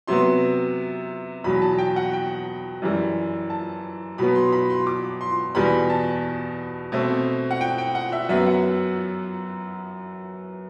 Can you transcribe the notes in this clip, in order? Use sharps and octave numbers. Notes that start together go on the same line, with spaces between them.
C3 F#3 B3 C6
E2 B2 F#3 B5
A5
G5
F#5
G5
F#2 E3 G3
A5
B2 F#3 B3 B5
C6
B5
C6
D6
C6
E2 B2 G3 B3 B5
A5
B2 A3 C4
F#5
G5
G5
F#5
E5
F#2 F#3 B3 E5
F#5